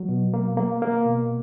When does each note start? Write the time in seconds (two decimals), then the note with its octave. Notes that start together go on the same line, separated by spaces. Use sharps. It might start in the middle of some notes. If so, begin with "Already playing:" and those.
Already playing: F#3
0.09 B2
0.34 A#3
0.57 A#3
0.82 A#3
1.06 B2